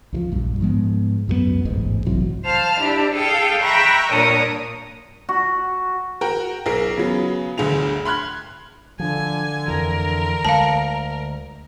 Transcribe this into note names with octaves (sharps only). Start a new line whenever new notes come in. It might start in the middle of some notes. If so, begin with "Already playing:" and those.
C#2 E3 F3
A#1 G2
G#2 F3 G#3 B3
C#2 F#2 F3 B3
E1 A1 G#2 G#3
B1 C3 E3 F#3
C5 F5 A5 F6
D4 E4 G4
G#4 A4 F5 G5
E5 G5 A#5 B5 C#6 F#6
G2 A#2 D4 A#4 C#5 D#6
F#4
F#4 A#4 G5 A#5
B1 G#4 A#4 C7
C#3 F#3 B3
G1 D2 D3 G#4 F7
B5 C6 F6 F#6 G#6
D3 F3 G#5
F2 E3 A#4
D2 G#3 F5 A5